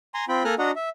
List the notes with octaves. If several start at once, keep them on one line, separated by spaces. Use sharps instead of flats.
G#5 A#5 C6
C4 F4 G5 B5
A#3 A4 G#5 A#5 F6 F#6
D4 F#4 D#5 F#5 A#5
E5